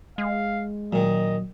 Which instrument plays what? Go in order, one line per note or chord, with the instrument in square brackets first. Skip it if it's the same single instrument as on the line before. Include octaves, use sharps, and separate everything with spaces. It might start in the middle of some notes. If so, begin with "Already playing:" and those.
[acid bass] G#3 [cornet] F5
[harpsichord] A#2 D#3 [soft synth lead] F#3 [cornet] D#5